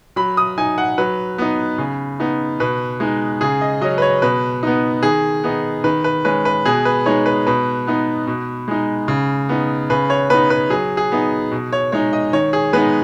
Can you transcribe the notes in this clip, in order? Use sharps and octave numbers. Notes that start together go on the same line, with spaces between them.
F#3 B5
D#6
D#4 G#5
F#5
F#3 B4
B3 D#4
C#3
B3 D#4
B2 B4
G#3 D#4
C#3 G#4
D#5
F#3 C#4 D#5
B4
C#5
B2 B4
B3 D#4
D#3 G#4
B3 D#4
D#3 B4
B4
G#3 C#4 B4
B4
B2 G#4
B4
G#3 D#4 C#5
B4
B2 B4
B3 D#4
B2
G#3 D#4
C#3
B3 D#4
C#3 B4
C#5
B3 D#4 B4
B4
F#3 G#4
G#4
B3 D#4
B2
C#5
G#3 D#4 C#5
D#5
D#3 C#5
G#4
G#3 B3 D#4 B4